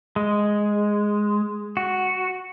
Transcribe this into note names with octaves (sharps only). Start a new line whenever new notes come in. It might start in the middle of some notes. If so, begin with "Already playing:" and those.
G#3
F#4